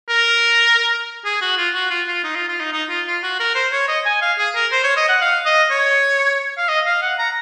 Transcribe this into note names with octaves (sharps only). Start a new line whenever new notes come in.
A#4
G#4
F#4
F4
F#4
F4
F4
D#4
F4
F4
D#4
D#4
F4
F4
F#4
A#4
C5
C#5
D#5
G#5
F5
G#4
A#4
C5
C#5
D#5
F#5
F5
D#5
C#5
F5
D#5
F5
F#5
A#5